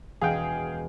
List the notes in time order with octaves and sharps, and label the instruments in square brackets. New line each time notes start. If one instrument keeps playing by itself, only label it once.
[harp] E1 [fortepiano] G#4 F5 G5